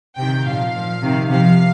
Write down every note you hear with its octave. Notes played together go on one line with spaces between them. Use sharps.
C3 D#3 G5
A#2 F3 F5
A#2 F3
C3 D#3
C3 F3 F5